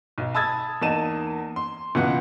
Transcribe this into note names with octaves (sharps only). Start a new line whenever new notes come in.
B1
A5 B5 D#6 E6 G#6 A6
E2 A#3 D#4 A5 D#7 E7
C6
C#2 B2 E3 F4 B4 F#5